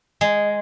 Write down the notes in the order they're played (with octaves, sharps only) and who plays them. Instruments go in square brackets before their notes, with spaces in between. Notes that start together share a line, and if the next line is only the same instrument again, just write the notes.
[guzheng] G#3